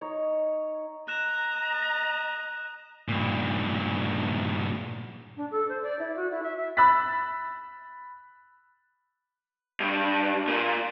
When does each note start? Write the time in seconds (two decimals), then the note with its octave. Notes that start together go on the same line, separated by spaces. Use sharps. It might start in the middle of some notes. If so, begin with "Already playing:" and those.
0.01 D#4 C#5
1.08 D#5 A#5 F#6 E7
3.08 G2 A#2
5.36 D4
5.51 A4
5.69 C5
5.82 D5
5.99 E4
6.16 F#4
6.30 E4
6.43 E5
6.57 E5
6.77 B5 E6 F#6 A6 B6
9.80 G2
10.47 A#2